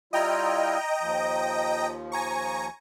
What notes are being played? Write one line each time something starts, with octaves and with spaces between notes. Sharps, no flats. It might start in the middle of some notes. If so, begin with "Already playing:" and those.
G3 E4 F4 D#5 G5 A#5
D#2 F3
G#5 A#5 C#6